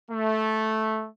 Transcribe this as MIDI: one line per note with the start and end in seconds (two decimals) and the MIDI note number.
0.11 1.06 57